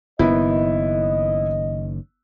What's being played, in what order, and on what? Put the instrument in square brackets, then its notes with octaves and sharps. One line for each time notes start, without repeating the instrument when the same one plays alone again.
[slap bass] F#1 F#2 D#3 [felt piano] B3 E4 [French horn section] D#5